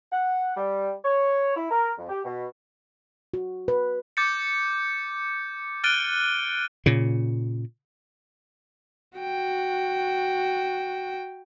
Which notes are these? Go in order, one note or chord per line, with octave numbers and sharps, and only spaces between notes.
F#5
G3
C#5
E4
A#4
F2
G4
B2
F#4
B4
D6 G6 A6 C#7
F6 F#6 A6 D7 D#7 G7
A#2 C#3
F#4 G5